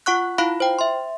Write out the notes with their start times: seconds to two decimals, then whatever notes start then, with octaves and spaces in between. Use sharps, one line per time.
0.06 F4 F#5 C#6 F#6
0.38 E4 F4 F5 B5
0.60 C5 G5
0.79 E5 C6